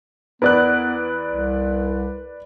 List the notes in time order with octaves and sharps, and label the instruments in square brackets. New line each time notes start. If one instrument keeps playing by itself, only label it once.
[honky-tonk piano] E2 E4 A#4 [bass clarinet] B3 [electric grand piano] B4 D5 F#6
[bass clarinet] C2